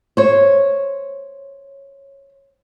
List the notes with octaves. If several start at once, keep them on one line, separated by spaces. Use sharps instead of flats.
C5 C#5